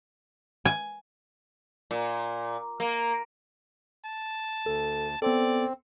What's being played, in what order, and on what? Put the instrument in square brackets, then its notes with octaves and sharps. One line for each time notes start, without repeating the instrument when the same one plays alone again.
[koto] G#5
[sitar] A#2
A#3
[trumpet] A5
[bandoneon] D2 [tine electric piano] A4
[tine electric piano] B3 A4 [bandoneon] C4 [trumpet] D5